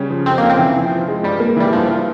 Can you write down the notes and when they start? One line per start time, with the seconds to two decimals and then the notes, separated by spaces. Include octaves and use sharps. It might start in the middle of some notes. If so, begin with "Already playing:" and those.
Already playing: C#3 G3 C#4
0.10 F3
0.26 F2 C4
0.38 A#3 C#4
0.50 C4
0.59 E3
0.75 F3
0.91 F3
1.08 G#3
1.23 G2 G3
1.40 A#3
1.56 E3 G3
1.73 G2 F3
1.89 F4